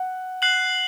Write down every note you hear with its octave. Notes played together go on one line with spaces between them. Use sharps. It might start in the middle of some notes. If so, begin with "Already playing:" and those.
Already playing: F#5
F#6 C7 F#7